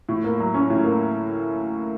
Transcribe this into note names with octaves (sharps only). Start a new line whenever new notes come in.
A2
A#3
F#3
C#4
A2
A#3